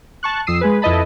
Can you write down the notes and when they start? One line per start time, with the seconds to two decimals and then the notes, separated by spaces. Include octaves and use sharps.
0.23 A5 C#6 F#6
0.47 F2 D#6 E6 C7 D#7
0.61 G#3 G#4 B4
0.82 F2 E4 B4 D#5 A5 B5